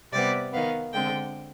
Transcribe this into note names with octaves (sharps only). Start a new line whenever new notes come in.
C3 G3 B3 D5
D#3 B3 F5
D3 G#3 C4 G5